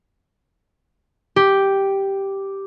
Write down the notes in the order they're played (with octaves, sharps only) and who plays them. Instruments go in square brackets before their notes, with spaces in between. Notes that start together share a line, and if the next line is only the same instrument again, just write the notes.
[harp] G4